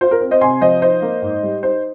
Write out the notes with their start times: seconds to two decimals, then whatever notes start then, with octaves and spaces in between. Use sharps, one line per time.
0.01 F4 C5
0.11 A#4
0.21 C4
0.31 C5 D#5
0.41 C3 G#5 C6
0.61 F3 C5 D#5
0.82 D#4 C5 D#5
1.02 A#3
1.22 G#2
1.42 G3
1.63 D#4 C5